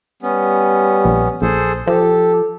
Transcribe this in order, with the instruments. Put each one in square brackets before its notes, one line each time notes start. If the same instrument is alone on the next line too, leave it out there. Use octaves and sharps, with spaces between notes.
[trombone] G3 [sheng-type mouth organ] B3 C#4
[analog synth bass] A#1
[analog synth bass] A#1 [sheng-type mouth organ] G#4 A4 C5
[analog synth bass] F3 [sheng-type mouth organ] G4 [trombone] A4